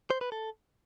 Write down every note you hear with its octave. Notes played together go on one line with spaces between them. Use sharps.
C5
B4
A4